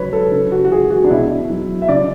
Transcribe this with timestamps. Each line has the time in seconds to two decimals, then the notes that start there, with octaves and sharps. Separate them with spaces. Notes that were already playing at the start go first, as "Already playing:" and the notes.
Already playing: C#3 F#3 B4 C#5
0.13 A4
0.32 C#3
0.52 F#4
0.65 F#4
0.71 E3 G#4
0.91 F#4
1.04 D4
1.11 B2 E4
1.49 F#3
1.82 E5
1.89 C#3 D5